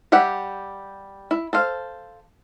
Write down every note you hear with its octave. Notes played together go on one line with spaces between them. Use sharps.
G3 G4 E5 F#5
E4
A4 C5 F5